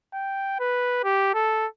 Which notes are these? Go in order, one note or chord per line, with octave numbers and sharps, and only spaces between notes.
G5
B4
G4
A4